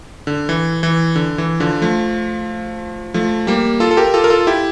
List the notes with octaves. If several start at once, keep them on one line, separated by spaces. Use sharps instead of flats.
D3
E3
E3
D3
E3
D3 F3
F3 A3
F3 A3
G3 A#3
F4 A4
A4
G4 A#4
F4 A4
A#4
F4 A4
E4 G4